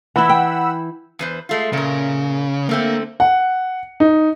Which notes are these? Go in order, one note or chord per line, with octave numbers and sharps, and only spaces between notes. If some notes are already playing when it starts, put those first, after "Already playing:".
E3 E4 F#5 B5 E6
G5
E2 B4 C5
G#3 A3 F4
A#2 C#3 A#4
D3 A3 A#3 C4
F#5
D#4